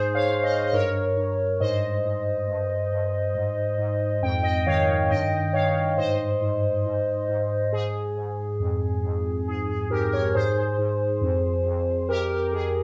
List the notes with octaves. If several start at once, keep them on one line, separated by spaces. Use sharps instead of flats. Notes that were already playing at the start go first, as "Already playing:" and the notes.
Already playing: G#2 G#4 C5
C#5 F5
G#2
C5 D#5
D#5
G2 A#4 C#5
G2
G#2 C5 D#5
G#2
G2
G2
G#2
G#2
F2 G5
D#5 G5
D#3 C#5 F5
G2 D#5 G5
G2 C#5 F5
G#2 C5 D#5
G#2
G#2
G#2
G#2 G#4
G#2
F2
F2
G#2 G#4
G#4
G#2 G4 A#4
A#4 C#5
G#2 G#4 C5
G#2
F2
F2
F2 G4 A#4
G4
F2 G#4